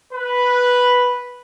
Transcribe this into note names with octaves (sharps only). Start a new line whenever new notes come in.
B4